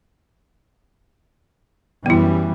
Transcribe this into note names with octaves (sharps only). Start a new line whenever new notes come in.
F#2 E3 G3 B3 E4